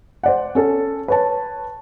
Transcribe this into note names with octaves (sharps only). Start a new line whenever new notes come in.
C5 D5 F#5
C#4 A4
B4 C#5 A5